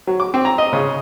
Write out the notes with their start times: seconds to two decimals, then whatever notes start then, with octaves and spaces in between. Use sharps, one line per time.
0.07 F#3
0.20 D6
0.34 C4
0.45 A#5
0.58 D#5
0.73 C#3